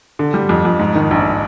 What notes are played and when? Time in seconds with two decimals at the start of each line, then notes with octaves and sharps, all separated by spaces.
0.19 D3
0.34 G3
0.49 F2
0.65 F2
0.79 G#2
0.95 D#3
1.11 A#1